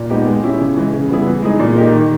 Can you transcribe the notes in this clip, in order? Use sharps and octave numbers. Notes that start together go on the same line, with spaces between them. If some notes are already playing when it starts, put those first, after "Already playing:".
Already playing: A#2
G#3 B3 D#4 G4
G#3
C#4 E4 G4
C#3
E3 G#3
C#3
G3 B3 E4 G#4
E3
G#3 D#4 G#4
A#2
A#3 D#4 G4
D#3